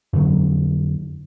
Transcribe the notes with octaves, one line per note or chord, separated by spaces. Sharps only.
F2 D3 F#3